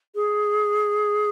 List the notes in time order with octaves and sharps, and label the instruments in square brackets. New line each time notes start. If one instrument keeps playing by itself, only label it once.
[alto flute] G#4